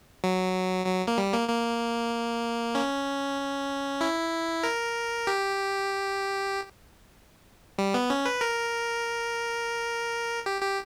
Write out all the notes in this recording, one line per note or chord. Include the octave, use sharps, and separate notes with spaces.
F#3
F#3
A#3
G3
A#3
A#3
C#4
E4
A#4
G4
G3
B3
C#4
B4
A#4
G4
G4